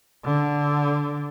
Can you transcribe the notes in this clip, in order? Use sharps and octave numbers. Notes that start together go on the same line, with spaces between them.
D3